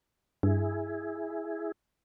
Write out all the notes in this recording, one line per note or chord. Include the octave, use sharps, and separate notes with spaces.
G2 E4 G#4